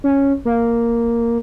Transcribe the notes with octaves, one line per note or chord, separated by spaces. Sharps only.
C#4
A#3